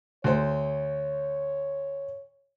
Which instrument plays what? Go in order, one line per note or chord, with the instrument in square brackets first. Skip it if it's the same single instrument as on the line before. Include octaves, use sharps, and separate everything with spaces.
[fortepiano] D2 C5 [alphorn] C#5